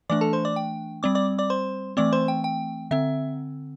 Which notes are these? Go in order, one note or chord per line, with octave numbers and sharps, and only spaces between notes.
E3 A3 D4 D5 D6
A4 A5
C5 C6
D5 D6
G5
G3 C4 D5 D6
D5 D6
D5 D6
C5 C6
E3 A3 C4 D5 D6
C5 C6
G5
G5
D3 C4 E5